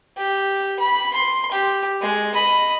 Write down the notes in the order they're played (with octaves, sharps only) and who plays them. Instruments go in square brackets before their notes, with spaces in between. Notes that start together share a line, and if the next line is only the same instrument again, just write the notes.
[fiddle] G4
B5
C6
G4
G#3
D#5 B5